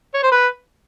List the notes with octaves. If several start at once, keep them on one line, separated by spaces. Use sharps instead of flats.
C#5
C5
B4